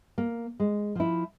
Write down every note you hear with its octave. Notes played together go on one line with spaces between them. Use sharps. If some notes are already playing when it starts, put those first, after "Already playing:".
A#3
G#3
F3 E4